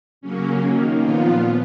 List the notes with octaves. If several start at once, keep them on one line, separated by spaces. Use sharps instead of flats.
C#3 F#3 A#3 C#4
D#3 A#3
A#2 F3 B3 F4